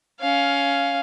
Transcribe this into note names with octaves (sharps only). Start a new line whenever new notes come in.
C#4 F5